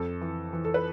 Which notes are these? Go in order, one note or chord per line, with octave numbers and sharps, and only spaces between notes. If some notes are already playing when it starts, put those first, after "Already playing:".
Already playing: F2 A4
E3
E3
A4
B4